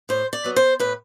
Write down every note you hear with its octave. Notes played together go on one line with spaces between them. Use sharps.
A2 C5
D5
F#3 B3
C5
A2 B4